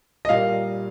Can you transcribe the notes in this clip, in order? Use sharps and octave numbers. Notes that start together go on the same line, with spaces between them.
D#5
A#2 G3 A#3 F5